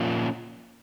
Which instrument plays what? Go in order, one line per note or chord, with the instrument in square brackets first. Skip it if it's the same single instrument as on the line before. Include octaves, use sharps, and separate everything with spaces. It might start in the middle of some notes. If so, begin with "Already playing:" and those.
Already playing: [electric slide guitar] A#2 F3 A#3 C#4 F4